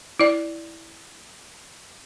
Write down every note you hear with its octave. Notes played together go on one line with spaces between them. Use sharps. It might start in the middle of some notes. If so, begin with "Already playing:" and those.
E4 D5